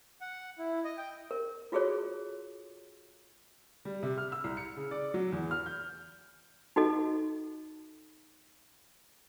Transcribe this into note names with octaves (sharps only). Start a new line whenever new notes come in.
F#5
E4
D#5
G5
A#4
F4 F#4 G#4 A4 C#5
G3
C3
F6
E6
C2
C#7
C#3
D5
F#3
E2
F6
G6
D#4 F#4 A4 D#5